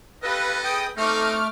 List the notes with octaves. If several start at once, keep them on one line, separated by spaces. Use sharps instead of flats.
C#4 G4 A4 B4 D#5 F5
G#4 B4 G5 D#6
A3 C4 D#4 A4 D6 F6